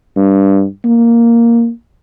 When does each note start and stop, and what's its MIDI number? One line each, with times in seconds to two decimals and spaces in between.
0.16 0.64 43
0.84 1.69 58